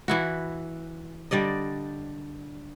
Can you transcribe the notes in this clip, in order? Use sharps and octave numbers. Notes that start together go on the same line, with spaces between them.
E3 E4 F#4
D3 G3 D5 D#5